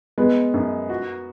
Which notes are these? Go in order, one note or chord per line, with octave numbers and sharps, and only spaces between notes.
G#3 B3
F#2
F#4